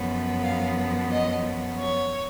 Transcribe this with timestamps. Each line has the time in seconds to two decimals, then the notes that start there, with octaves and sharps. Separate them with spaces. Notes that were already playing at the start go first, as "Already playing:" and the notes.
Already playing: F#2 F3 B3
0.42 F5
1.11 D#5
1.78 C#5